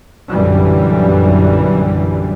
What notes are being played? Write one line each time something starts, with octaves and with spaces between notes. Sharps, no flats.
A#1 F#2 D3 E3 G3